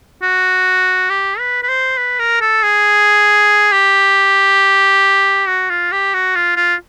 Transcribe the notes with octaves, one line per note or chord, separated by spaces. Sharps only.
F#4
G4
B4
B4
C5
B4
A#4
A4
G#4
G4
F#4
F4
G4
F#4
F4
F4